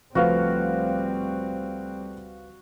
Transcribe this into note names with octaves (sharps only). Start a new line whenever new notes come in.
C#2 F3 G3 A3 C4 F#4 B4 F5